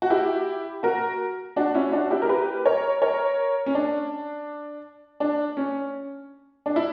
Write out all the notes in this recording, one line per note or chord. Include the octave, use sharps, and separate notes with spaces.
F#4
E4 G4
F#4 A#4
D4 F#4
C#4 E4
D4 F#4
E4 G4
A#4
G4 B4
A#4 C#5
A#4 C#5
C#4
D4
D4
C#4
D4
E4